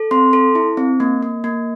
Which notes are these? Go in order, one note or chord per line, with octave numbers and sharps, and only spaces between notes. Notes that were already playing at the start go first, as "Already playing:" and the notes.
Already playing: A4
C4 C6
A4
E4
C4
A#3
A#3
A#3